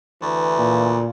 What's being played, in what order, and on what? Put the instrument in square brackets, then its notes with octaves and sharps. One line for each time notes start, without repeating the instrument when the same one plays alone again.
[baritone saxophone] D2 [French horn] E3
[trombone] A#2